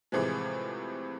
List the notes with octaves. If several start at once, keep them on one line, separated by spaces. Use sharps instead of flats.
A2 C3 E3 F3 G#3